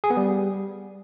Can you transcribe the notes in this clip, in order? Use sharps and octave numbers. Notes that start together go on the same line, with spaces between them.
G#4
B3
G3